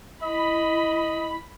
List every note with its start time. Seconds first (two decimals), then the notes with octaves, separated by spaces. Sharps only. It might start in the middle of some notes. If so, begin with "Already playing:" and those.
0.23 E4 D#5 B5